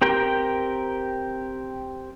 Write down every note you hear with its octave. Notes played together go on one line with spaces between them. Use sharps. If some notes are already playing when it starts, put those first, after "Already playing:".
C4 G4 A#4 G5